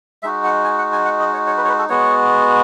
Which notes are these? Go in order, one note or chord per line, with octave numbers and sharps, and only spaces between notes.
G#3 D#4 F#4 E5
F#5
G#5
F#5
G#5
F#5
D#5
C#5
C#5
B4
C#5
B4
A4
G#3 B3 F#4 C#5